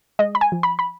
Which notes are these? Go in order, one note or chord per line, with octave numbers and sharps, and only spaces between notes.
G#3 D#5
B5
G#5
F3
B5
B5